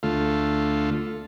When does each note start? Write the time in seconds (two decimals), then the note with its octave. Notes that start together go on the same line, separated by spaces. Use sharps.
0.03 D2 A3 F4